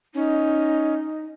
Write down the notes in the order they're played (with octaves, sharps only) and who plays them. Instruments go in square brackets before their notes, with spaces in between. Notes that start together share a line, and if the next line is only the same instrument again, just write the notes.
[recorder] C#4 [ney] D#4